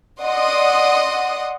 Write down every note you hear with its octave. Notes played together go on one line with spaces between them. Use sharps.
D5 D#5 F#5 C6 D#6